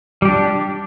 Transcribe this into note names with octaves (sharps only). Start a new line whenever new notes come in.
G3 D4 G4